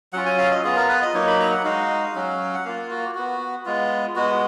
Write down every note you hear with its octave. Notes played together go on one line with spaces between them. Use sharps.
F#3 C#4 F4 F#5
G#5
F5
D#5
B3 F4 G#4
A#4
B4
D#5
F#3 A#3 D#4 C#5
B5
A#5
F#5
G#3 D#4 F#4 F5
F#3 C#4 F#4
F#5
A#3 F4 F5
F#4
B3 F#4
G#3 B3 F4
G#3 B3 F#4